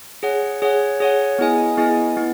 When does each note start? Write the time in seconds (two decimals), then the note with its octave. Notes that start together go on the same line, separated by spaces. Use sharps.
0.23 G#4 C#5 F#5
0.62 G#4 C#5 F#5
1.00 G#4 C#5 F#5
1.39 B3 E4 G#4 D#5 G#5
1.77 B3 E4 G#4 D#5 G#5
2.17 B3 E4